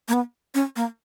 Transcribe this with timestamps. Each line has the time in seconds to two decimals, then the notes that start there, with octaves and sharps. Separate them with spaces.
0.08 A#3
0.13 B3
0.55 C#4
0.76 A#3